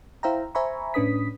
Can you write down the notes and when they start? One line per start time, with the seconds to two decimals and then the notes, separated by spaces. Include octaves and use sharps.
0.23 E4 C5 E5 F5 G5 A#5
0.55 C5 E5 G#5 A#5 B5 C#6
0.94 A2 C#4 D4 B4 D#6 B6